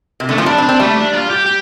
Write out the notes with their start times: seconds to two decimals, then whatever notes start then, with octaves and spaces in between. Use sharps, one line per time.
0.20 C3
0.29 D3 A3
0.38 F3 C4
0.46 G3 D4
0.58 C4
0.63 D4
0.69 C4
0.80 G3 A3
0.97 D4
1.14 F4
1.30 G4
1.46 G4